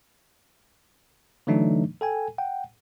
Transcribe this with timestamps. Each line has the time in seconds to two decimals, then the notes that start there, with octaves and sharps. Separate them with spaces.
1.47 D3 E3 F#3 A3 D4 D#4
2.01 A4 G5 G#5
2.38 F#5 G5